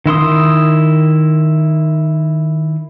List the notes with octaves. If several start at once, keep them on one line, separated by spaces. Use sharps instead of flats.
D#3 E4 C6 D#6